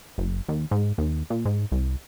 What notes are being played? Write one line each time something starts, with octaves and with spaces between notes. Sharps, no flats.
F#1
D#2
G#2
D#2
A#2
G#2
C2